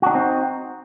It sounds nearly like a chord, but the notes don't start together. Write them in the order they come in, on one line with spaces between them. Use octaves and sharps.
F#4 D4 D#4 C4